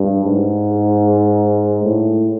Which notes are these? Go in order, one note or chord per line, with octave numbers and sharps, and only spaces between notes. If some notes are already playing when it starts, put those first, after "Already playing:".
Already playing: G2
G#2
A2